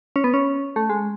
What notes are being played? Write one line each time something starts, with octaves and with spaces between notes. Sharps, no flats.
C#4
B3
C#4
A3
G#3